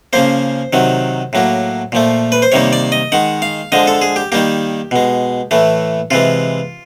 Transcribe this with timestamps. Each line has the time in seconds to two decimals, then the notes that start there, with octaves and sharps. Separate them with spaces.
0.13 C#3 F3 A#3 C5
0.73 C3 D#3 F#3
1.33 A2 F#3 A#3
1.92 A#2 F3 A3
2.32 B4
2.42 C5
2.52 C3 D#3 G3 A#3 C#5
2.73 D5
2.92 D#5
3.12 D#3 G#3 F#5
3.42 F5
3.72 D3 F3 G#3 D#5
3.87 A4
4.02 G#4
4.16 G4
4.32 D#3 G3 A#3 G4
4.91 B2 G#3
5.51 A2 E3 A3
6.11 C3 E3 G#3 F4